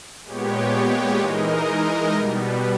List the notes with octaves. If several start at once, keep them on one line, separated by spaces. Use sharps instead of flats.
A#2 G#3 B3 G4 C#5
E3 G#3 D#4 A#4 D#5
B2 G3 B3